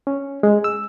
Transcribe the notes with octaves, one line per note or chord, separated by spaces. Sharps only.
C#4
G#3
E6